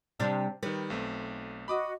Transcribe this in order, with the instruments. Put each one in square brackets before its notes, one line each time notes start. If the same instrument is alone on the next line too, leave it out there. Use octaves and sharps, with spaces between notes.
[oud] C3 G3 D4
[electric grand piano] D#3 G3 [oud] B4
[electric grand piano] B1 A3 C4
[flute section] F#4 D#5 [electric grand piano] B5 D6 D#6